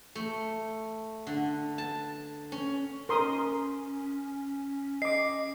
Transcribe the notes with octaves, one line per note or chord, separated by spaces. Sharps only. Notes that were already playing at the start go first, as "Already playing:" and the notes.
A3
D3
A5
C#4
C#4 A#4 C6 D#6
D#5 D6 C7